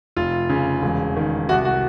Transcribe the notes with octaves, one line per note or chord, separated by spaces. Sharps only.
F1 F4
C#3
E1
D#3
C2 F#4
F#4